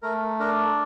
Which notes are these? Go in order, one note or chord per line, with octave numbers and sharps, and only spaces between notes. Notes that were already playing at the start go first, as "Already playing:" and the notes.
A3 A#4
D4 A#4